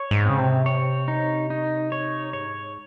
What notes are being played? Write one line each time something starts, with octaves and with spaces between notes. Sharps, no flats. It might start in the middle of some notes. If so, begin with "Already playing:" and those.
Already playing: C#5
G#2
C#3 C4
C3
C#5
D#4
D#4
C#5
G#2 C#5